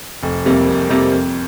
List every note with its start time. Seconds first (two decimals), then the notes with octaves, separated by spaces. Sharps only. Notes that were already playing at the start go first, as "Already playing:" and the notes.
0.23 F1
0.45 F2 C3 G3 A#3
0.68 F1
0.89 F2 C3 G3 A#3
1.12 F2